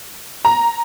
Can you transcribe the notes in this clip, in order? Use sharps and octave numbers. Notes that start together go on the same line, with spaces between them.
A#5